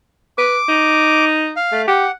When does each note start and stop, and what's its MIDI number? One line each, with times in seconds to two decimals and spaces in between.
0.38 0.57 71
0.38 1.25 86
0.68 1.54 63
1.56 1.82 77
1.72 1.86 57
1.87 2.06 67
1.87 2.11 78